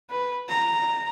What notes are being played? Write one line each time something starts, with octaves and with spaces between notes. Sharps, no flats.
B4
A#5